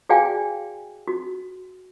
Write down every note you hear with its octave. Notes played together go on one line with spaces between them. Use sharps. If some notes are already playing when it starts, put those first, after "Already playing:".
F#4 G#4 D5 F5 G5 G#5
F#4